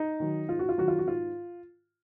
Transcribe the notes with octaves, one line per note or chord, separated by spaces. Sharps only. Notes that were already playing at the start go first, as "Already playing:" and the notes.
Already playing: D#4
D#3 F#3
G#2 F4
F#4
F4
D#3 F#3 F#4
F4
F#4
G#2 F4